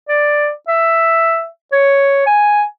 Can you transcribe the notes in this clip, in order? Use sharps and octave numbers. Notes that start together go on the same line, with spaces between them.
D5
E5
C#5
G#5